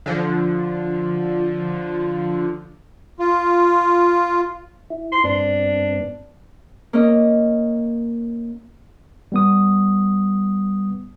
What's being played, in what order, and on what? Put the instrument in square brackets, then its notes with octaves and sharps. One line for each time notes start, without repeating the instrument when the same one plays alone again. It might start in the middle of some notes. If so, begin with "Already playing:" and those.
[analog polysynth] D3 F3
[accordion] F4
[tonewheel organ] E4
[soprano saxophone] C6
[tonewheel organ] G2 B3 C4 [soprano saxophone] D4
[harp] A#3 C#4 D#5
[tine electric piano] G3 B3 D#6